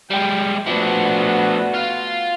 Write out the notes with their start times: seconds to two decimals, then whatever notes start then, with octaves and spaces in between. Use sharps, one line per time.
0.10 G3 G#3 G5
0.66 F3 A3 B3 D4 F#4
1.74 F4